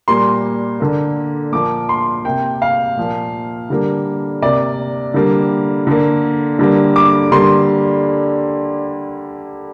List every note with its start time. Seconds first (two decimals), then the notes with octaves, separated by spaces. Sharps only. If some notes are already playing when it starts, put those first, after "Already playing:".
0.08 A#2 G3 A#3 C6
0.80 D3 A#3
1.52 A#2 F3 A#3 D6
1.89 C6
2.25 C3 A#3 G5
2.62 F5
2.97 A#2 F3 A#3
3.70 D3 G3 A#3
4.42 C3 A#3 D5
5.14 D3 G3 A#3
5.87 D3 A#3
6.59 D3 G3 A#3
6.96 D6
7.31 D3 G3 A#3 C6